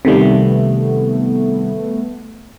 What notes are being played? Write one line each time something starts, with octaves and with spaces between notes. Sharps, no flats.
C3 D#3 G3 A3 B3